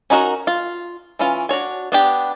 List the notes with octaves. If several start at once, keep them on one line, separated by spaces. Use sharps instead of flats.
C#4 D#4 F#4 A#4
F4
E3 C#4 F4
D4 F#4 C#5 G#5
B3 D4 G4